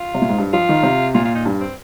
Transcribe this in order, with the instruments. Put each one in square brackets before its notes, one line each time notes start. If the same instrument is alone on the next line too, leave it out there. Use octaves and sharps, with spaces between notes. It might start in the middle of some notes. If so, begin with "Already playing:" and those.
Already playing: [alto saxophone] F4
[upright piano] C3
A#2
G#2
G2
[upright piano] F3 [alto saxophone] F4
[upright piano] D#3
C3
[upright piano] A#2 [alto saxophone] F4
[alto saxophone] F4
D#4
[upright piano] G2
[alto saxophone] C4